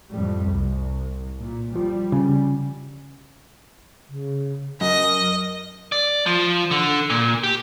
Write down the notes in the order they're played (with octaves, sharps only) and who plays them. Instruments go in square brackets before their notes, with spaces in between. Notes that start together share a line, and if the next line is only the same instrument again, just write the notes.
[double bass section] F2 A2 G3
C2
A#2
[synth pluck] F3 [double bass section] G3
[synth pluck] C#3
[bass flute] C#3
[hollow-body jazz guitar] F#2 [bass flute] A#4 [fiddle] D#5
[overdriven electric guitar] D5
F3
D3
A#2
G4